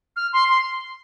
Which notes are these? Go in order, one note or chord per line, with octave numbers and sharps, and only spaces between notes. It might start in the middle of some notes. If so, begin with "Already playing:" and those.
F6
C6
C6